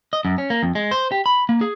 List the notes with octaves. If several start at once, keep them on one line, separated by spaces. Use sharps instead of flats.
D#5
F#2
C#4
A#3
F2
G#3
C5
G4
B5
A#3
G#4